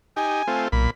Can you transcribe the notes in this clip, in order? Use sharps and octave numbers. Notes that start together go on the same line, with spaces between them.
D#4 G4 G#5
A3 C4 F4
B1 A#2 B5